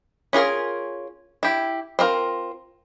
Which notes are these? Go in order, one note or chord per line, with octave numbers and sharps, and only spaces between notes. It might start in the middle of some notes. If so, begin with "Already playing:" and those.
C#4 F4 G#4 A#4
E4 G4
C4 F4 A#4